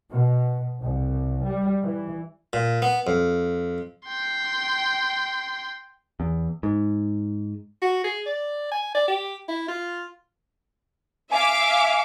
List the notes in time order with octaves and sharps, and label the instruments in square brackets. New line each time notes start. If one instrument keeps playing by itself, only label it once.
[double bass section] B2
C2
G3
E3
[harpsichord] A#2
B3
F2
[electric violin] G5 C6
[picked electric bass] E2
G#2
[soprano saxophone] F#4
G#4
D5
G#5
D5
G4
E4
F4
[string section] E5 F5 D6 [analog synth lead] G#5